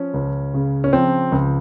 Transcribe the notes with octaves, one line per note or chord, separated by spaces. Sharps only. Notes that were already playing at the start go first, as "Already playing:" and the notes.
Already playing: F3 C#4
C#2
C#3
C#4
F3 C4
C#2